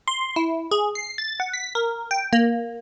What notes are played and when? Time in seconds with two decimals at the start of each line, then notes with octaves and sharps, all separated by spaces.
0.08 C6
0.36 E4
0.71 G#4
0.95 C7
1.18 A6
1.40 F#5
1.53 B6
1.75 A#4
2.11 G5
2.33 A#3